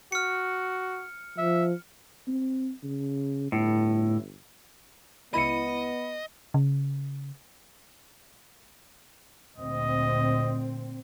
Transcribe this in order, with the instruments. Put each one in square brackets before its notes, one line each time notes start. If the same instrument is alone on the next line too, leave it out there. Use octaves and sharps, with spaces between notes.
[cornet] F#4 [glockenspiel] F6 C#7
[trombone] F3 [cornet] E5
[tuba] C4
C#3
[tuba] G1 [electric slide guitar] A2
[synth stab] C#2 E4 D#7 [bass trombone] B3 [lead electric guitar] D#5 [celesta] B5 C#7
[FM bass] C#3
[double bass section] D2 A#2 C4 [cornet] D#5